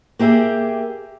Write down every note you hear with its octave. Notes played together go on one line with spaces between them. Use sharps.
A#3 G4 G#4 E5 G5